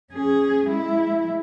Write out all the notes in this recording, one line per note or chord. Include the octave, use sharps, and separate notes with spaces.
C#4 G#4
G#3 E4